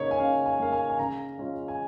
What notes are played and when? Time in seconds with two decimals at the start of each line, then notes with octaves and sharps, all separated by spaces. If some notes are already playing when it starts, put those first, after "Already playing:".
Already playing: C#3 A#3 D#4 C#5
0.11 G#5
0.19 C#3 F5
0.46 G#5
0.60 A#3 D#4 F5
0.72 G#5
0.90 G#5
0.99 C#3 A#5
1.38 G#3 C#4 F4
1.68 G#5